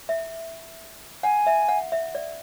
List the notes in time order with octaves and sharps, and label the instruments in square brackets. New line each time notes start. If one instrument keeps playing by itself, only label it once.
[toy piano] E5
[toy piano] F#5 [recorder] G#5
[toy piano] E5
F#5
E5
D5